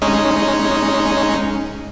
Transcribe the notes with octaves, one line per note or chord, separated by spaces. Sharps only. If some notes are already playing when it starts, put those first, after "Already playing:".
G#3 C#4 D#4